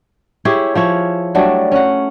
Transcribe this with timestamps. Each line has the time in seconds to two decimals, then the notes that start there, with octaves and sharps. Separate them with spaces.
0.45 E4 G4 G#4 C#5
0.75 F3 E4 C#5
1.35 F#3 G3 A3 D4
1.72 C#4 F#5